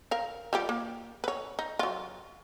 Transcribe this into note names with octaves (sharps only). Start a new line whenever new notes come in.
A#4 F5
G3 F4 G4
A#3
B4 C#5
D#4
F#3 F4